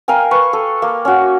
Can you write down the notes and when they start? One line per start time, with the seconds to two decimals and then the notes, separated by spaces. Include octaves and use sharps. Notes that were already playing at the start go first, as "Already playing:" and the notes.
0.08 A#4 F5 G5 G#5
0.31 B4 C#6
0.53 A4
0.82 A#3
1.05 C#4 F#4